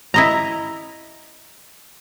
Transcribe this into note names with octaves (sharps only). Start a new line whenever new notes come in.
E4 D#5 A#5